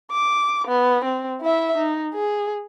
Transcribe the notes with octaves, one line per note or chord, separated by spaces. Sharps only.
D6
B3
C4
E4 E5
D#4
G#4